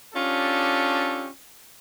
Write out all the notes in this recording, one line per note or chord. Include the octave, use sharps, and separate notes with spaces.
C#4 D4 F4 G4 A4